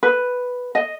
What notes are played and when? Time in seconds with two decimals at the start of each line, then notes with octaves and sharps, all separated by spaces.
0.03 B4
0.75 D#5